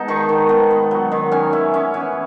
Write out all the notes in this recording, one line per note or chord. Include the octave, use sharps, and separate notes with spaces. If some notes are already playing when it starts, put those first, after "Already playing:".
Already playing: G#3 B3 D#4 A5
D#3 C#6
D#3
B3
B3
F#3
D#3
C#4 G#5
E4
C#4
E3